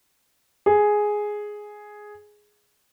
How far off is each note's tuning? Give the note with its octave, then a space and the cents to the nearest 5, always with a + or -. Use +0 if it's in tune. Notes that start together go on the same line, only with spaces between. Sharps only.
G#4 +5